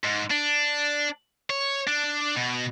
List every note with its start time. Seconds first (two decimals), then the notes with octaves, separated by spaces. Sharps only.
0.04 G#2
0.31 D4
1.50 C#5
1.88 D4
2.36 B2